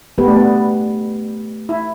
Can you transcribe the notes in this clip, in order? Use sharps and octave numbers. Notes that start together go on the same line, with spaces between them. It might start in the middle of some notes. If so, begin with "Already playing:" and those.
A3 B3 G4 B4
D4
B3
E4